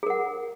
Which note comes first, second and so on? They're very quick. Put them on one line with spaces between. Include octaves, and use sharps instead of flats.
G#4 A#4 F#5